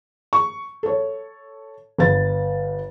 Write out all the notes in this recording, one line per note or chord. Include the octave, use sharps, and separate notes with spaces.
C#6
A4 C#5
G1 B4 A6